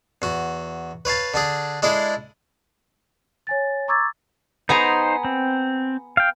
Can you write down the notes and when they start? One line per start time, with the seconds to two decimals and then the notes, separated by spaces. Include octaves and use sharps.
0.22 E2 F#4
1.05 B4 C#5 F5 A5
1.34 D3 D4 G#4
1.82 G#3 D4 E4 G#4 A4
3.47 C#5 G#5 A6
3.88 A#5 C#6 D6 E6 G#6 A6
4.69 B3 D#4 G#4 C5 A#5
5.25 C4
6.17 F5 G5